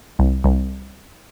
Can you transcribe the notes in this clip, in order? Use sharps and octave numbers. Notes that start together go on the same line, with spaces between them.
C2
C2